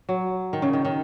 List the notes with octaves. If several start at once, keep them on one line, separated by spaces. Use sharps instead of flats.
F#3
D#3
C#3
D#3
D#3